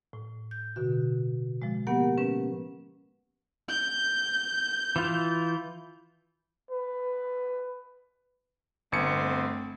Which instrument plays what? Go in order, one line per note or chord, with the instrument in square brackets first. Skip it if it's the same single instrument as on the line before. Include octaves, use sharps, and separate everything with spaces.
[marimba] A2
G6
B2 D3 F#4
F3 G#3
A#3 B3 G4 A#4 F#5
C#4 B4
[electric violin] G6
[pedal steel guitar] E3 F4
[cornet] B4
[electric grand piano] G1 C#7 [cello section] A3 C4